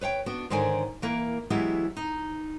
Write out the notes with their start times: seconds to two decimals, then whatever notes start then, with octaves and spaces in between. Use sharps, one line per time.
0.01 B4 C#5 F#5 G5
0.26 B3 D4 F#4
0.50 G#2 D3 D#3 C#5 D5 G#5
1.02 E3 A#3 A#4
1.50 E3 F#3 G#3 B3 E4 G4
1.97 D#4